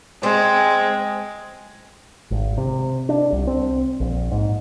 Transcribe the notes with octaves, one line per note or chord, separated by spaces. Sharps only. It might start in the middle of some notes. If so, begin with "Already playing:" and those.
G#3 C4
G#1
C3
D4
C2
C4
A#1
G#2